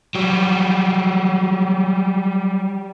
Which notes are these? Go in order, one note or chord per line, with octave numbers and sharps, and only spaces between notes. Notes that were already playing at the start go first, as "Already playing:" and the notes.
F#3 G3